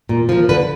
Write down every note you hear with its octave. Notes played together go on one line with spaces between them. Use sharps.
A#2
F3 A#3
D3 B4